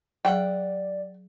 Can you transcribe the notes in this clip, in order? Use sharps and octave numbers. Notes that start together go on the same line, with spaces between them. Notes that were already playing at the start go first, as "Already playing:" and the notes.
F#3 G#4 D5 F#5 G5